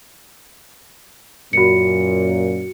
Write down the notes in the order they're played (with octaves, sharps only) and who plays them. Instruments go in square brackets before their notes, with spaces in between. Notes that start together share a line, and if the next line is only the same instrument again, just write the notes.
[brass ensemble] F#2 A#2 [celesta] F#4 C#7